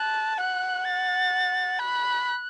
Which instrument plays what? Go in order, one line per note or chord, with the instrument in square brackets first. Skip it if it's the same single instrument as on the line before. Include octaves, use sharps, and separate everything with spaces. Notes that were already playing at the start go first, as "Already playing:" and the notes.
Already playing: [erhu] A5 [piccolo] F#6
[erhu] F#5 [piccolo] F#6
[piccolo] A6
[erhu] B5 [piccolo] F#6